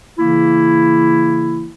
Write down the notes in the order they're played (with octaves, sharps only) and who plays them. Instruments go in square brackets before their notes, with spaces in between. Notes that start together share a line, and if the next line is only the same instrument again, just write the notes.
[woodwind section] C#3 E3 A#3 E4